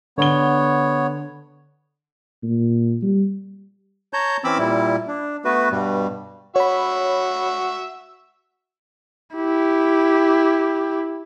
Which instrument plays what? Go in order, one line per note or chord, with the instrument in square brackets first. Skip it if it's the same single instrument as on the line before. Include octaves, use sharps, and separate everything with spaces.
[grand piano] D3 G7 [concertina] B3 C#5
[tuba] A#2
G3
[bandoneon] C#5 A5 A#5 G6
E3 C4 C#4 B5 D6 E6
A#2 G3 E4
D4
A3 B3 F#4 B4
G2 B2 G3
[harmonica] F#4 E5 [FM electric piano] C#5 B5
[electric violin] E4 G4